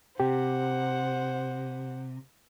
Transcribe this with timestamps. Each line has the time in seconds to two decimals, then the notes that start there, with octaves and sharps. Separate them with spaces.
0.20 C3 G4 C5 F#5